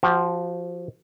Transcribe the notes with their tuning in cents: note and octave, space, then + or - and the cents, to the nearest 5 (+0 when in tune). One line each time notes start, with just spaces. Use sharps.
F3 +0 F#4 +35